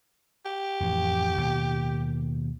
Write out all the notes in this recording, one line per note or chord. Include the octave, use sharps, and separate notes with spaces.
G4
F2 A2 E3
D#2 B2